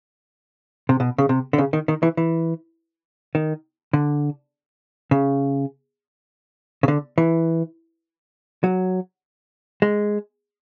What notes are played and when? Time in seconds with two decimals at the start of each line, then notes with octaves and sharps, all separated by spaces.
0.89 C3
1.00 B2
1.18 C#3
1.29 C3
1.53 D3
1.58 C#3
1.73 D#3
1.88 D#3
2.03 E3
2.17 E3
3.35 D#3
3.93 D3
5.11 C#3
6.83 C#3
6.88 D3
7.18 E3
8.64 F#3
9.82 G#3